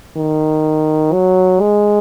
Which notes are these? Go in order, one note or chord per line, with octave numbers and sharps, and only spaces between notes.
D#3
F#3
G#3